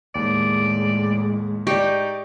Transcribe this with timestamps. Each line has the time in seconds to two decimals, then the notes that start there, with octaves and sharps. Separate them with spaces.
0.15 D#2 A2 G#3 D5
1.67 D#4 G4 D5 C#6